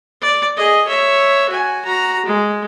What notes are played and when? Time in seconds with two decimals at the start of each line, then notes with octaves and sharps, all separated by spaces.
0.22 D5
0.57 G#4 D#5
0.88 C#5 E5
1.49 F#4 G#5
1.85 F#4 A#5
2.26 G#3